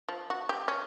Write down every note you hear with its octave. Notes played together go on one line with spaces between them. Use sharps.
F3
F#4
G4
C#4